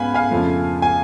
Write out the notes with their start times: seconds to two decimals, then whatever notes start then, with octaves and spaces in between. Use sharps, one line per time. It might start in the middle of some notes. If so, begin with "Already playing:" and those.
Already playing: G#2 B3 F5 G#5 B5
0.14 F5 G#5
0.30 F2 C#3 F3 A3
0.82 G#5